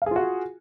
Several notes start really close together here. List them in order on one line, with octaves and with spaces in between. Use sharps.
F5 G#4 F4 F#4